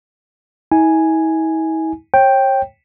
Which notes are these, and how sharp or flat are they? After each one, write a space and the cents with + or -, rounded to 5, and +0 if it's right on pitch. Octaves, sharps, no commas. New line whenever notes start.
E4 -45 G#5 +0
C#5 -35 G5 +0